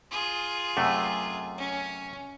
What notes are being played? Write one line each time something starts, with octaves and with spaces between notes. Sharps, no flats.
F4 G#4
F#2 C3 A3
C#4